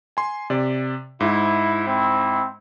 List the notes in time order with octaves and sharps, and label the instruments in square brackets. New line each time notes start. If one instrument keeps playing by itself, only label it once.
[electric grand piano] G#5 C6
C3 D5
[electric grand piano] G#2 [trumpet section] E4
[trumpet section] C4 E4